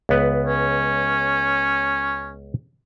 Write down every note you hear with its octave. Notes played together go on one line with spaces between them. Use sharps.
C#2 B3 B4
C#4